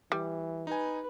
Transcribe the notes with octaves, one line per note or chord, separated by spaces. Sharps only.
E3 G3
D#4 B4 G#5